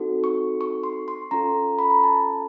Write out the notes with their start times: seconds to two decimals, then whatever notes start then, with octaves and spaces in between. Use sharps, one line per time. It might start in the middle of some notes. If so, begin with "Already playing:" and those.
Already playing: C4 D#4 F#4 A4
0.24 C#6
0.61 C#6
0.83 C6
1.08 C6
1.31 C#4 F4 A4 A#5
1.79 B5
1.91 A#5
2.03 A5